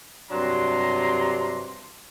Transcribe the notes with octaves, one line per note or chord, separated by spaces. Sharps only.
G2 C3 F#3 D4 A#5 C6